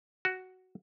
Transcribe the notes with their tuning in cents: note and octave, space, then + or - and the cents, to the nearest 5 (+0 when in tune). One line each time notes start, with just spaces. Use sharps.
F#4 +5